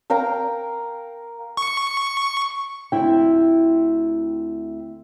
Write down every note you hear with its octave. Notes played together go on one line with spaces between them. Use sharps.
A#4 F5 G5 A#5
C#6
D2 C4 E4 G5